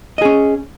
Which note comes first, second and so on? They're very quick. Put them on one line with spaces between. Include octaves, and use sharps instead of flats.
D#5 G#4 C#4